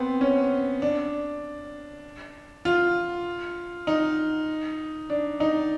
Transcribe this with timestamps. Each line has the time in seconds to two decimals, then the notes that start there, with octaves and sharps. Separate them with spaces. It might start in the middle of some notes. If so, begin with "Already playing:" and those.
Already playing: B3 C4
0.21 C#4
0.82 D4
2.65 F4
3.87 D#4
5.10 D4
5.40 D#4